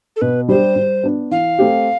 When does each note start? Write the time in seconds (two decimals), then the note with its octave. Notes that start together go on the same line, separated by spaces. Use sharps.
0.16 A4
0.21 B2 B4
0.49 G3 D4 G4 C5
0.76 G3
1.03 B3 D4
1.31 E3 F5
1.59 A3 C4 G4